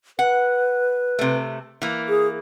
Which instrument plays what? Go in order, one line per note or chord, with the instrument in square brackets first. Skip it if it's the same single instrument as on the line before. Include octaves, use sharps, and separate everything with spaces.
[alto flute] B4 [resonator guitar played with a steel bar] F#5
[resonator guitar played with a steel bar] C3 A3
E3 A#3
[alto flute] G#4